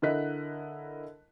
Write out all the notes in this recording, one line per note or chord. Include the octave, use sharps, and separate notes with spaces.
D3 E4 A#4 D#5 F#6 B6